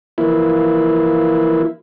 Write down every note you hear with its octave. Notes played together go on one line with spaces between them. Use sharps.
E3 F3 A#3 E4